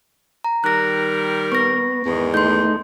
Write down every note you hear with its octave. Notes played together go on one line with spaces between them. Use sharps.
A#5
D#3 G3 A#4 F#6 A#6
B3 C#6 A#6
E2 G#2 D#3 B3
A3 D#4 C6 G6